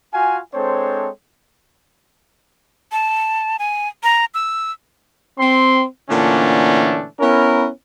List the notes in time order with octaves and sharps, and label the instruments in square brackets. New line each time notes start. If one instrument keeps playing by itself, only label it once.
[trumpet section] F4 F#4 F5 G#5
G#3 C4 D4 A4 C5 C#5
[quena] A5
G#5
A#5
E6
[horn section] C4 C6
A#2 D3 E3 A3 C#4 D4
B3 C#4 E4 A#4